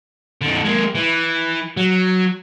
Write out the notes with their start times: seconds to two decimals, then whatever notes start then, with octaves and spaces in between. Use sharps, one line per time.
0.41 F2 D3
0.64 G#3 A#3
0.95 E3
1.77 F#3